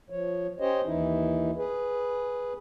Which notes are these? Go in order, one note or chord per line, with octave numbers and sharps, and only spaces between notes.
F3 C#5
C#4 G4 C5 C#5 D#5
D#2 E3 D#4 E4
G#4 B4